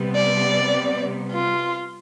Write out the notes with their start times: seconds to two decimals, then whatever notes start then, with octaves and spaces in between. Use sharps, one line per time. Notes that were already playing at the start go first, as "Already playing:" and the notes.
Already playing: C3 G3 B3
0.15 D5
1.32 F4